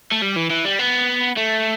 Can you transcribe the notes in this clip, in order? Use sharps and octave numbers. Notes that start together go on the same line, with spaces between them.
A3
G3
E3
E3
G3
B3
A3